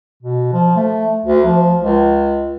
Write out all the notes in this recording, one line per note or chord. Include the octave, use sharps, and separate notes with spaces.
B2
F3
A3
D2
F3
C#2